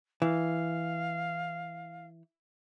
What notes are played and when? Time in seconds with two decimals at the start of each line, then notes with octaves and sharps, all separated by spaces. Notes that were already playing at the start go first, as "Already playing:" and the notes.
0.22 E3 F5